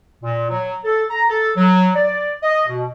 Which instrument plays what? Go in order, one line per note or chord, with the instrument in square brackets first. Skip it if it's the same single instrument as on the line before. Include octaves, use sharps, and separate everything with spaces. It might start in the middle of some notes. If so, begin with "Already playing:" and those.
[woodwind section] A#2
F#3
A4
A#5
A4
F#3
D5
D#5
B2